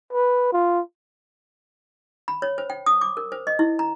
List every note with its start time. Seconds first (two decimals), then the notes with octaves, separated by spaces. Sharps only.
0.13 B4
0.53 F4
2.28 B5
2.42 C#5
2.58 C5
2.70 G5
2.86 D#6
3.01 D6
3.17 A#4
3.32 C5
3.47 D#5
3.59 E4
3.79 A#5